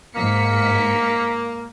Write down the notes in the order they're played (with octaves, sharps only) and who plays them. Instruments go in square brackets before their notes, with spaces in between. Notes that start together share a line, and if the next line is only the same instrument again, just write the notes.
[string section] G#2 B6 C#7 [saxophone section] A#3